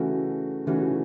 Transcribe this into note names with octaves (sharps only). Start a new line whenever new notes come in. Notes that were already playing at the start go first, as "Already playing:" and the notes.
Already playing: C#3 E3 A3 C#4 F#4
C#3 E3 A3 C#4 F#4